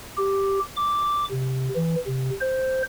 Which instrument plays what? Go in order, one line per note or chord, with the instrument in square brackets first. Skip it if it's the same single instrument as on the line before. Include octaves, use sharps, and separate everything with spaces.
[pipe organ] G4
D6
C3
E3
C3
C5